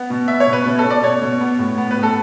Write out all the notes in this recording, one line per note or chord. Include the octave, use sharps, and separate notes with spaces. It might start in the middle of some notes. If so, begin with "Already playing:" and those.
Already playing: B3
B2
B2 E5
C#5
B2
B4
B2
A4
B2
D5
B2 C#5
B2
B3
A2
B3
B4
A2
A4